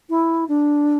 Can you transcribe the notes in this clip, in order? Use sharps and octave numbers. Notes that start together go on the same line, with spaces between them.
E4
D4